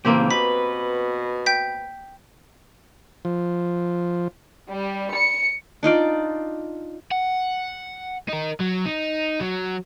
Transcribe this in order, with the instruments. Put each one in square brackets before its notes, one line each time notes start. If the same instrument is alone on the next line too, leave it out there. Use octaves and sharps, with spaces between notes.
[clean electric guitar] A#2 C#3 E3 [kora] A#3 C4 G4
[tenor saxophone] B2 [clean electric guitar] B4 [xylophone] B6
[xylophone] G5 G6 B6
[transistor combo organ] F3
[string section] G3
C#7
[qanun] D4 D#4 F4 D5
[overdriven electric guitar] F#5
D#4 A#4
F#3
D#4
F#3